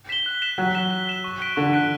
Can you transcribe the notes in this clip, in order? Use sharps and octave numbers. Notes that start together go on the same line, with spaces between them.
B6 E7 G7
F#6
B6 E7 G7
F#3 F#6
B6 E7 G7
F#6
B6 E7 G7
C#6
F#6 B6 D7
D3 C#6
F#6 B6 D7